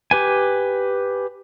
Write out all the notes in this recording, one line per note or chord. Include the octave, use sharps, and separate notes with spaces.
G4 B4 G#5